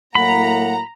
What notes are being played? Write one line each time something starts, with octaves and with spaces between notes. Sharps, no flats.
A2 F#3 A#3 F#5 A#5 B5